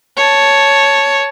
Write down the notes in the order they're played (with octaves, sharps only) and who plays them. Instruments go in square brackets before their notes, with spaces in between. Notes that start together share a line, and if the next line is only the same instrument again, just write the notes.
[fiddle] C#5 A5